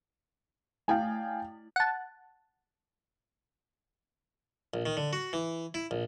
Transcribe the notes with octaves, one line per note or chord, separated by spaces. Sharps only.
A3 E4 F5 G5 G#5
F#5 A5
A#1
D#3
D3
F#4
E3
E4
A#1